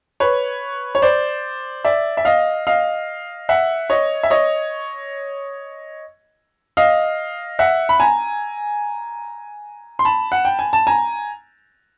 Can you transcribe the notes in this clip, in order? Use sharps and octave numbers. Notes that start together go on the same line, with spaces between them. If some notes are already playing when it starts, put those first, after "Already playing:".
B4 C#5
C#5
C5 D5
D5 E5
E5
D#5 F5
D#5 F5
E5 F#5
C#5 D#5
E5
C#5 D#5
D#5 F5
E5 F#5
B5
G#5 A#5
C6
A5 B5
F#5
G5
G#5
A5
G#5 A#5